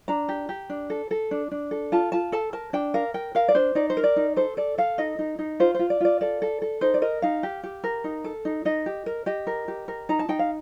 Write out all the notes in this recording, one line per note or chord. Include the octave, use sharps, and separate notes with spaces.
D4 A#5
G4
G4
D4
A4
A4
D4
D4
A4
F4 A5
F4 A5
A4 A5
A#4 A5
D4 G5
A#4 F5
A#4 G5
A#4 F5
D5
D4 C5
D#4 D5
C5
A#4
D5
D#4
A4 C5
A4 D5
A4 F5
D#4 D#5
D#4
D#4
F4 C5
F4 C5
D5
F4 D5
A4 D5
A4
A4
D#4 C5
D5
A#4 D#5
D#4 F5
G4
G4
A#4
D#4
A4
D#4
D#4 D#5
G4
A#4
G4 D#5
A#4
G4
A#4
D#4 A#5
A5
D#4 G5
F5